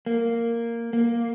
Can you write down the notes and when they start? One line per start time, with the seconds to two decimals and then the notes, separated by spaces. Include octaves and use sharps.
0.06 A#3
0.93 A#3